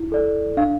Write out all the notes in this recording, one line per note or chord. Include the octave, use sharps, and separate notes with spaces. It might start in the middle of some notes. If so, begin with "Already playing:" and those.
Already playing: E4
A4 D5
D4 F5